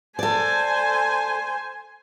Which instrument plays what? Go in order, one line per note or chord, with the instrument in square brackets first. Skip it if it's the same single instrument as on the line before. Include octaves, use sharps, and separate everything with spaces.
[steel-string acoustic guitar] A4 D5 [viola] C5 G#5